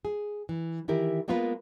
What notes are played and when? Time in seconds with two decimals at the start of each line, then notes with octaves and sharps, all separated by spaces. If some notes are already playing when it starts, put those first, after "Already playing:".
0.05 G#4
0.49 E3
0.88 D#3 E3 E4 G4 A#4
1.28 G#3 A#3 B3 F4 A#4 B4